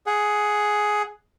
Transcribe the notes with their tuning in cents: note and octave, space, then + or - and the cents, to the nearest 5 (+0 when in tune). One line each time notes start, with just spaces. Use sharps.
G#4 +10 F#5 +0